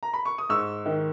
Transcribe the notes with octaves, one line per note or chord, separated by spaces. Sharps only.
A#5
B5
C#6
D#6
G#2 C#6 E6
D#3